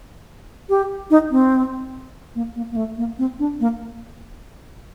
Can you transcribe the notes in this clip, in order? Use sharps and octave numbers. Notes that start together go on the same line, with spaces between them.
G4
D#4
C4
A#3
A#3
A#3
A3
A#3
C4
D4
A#3